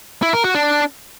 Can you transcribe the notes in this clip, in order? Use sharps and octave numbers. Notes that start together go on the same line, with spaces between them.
E4
A#4
F#4
D4